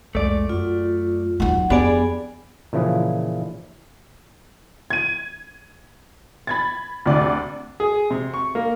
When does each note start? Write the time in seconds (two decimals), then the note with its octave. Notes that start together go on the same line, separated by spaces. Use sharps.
0.15 C2 F2 G#3 A3 D5
0.49 F#2 F4
1.40 A#1 D#2 F#3 D#4 F#5
1.70 F2 B3 D4 G4 G#4 D5 G#5 B5
2.73 A#2 C#3 E3 F3 G#4 B4
4.90 G#6 D#7
6.47 B5 G#6 A6
7.06 D2 C3 D5
7.80 G#4
8.10 C3
8.34 C#6
8.55 A#3